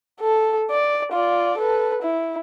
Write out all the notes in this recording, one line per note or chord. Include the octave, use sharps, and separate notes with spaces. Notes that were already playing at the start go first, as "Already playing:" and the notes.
A4
D5
F4 D5
A4 B4
E4